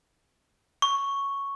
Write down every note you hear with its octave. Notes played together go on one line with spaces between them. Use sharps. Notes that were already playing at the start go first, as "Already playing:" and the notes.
C#6